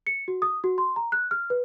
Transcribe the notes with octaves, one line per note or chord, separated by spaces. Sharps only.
C#7
F#4
D#6
F#4
C6
A#5
F#6
F6
B4